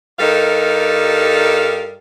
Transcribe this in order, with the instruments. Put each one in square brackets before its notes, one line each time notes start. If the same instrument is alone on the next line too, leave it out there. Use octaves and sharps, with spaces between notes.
[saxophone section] G2 G3 D#4 A4 A#4 F5